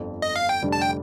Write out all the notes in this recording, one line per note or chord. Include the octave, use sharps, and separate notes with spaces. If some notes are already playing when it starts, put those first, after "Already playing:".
Already playing: G1 F2 D3
D#5
F5
G5
F1 F2 D3 G3 D4
A5
G5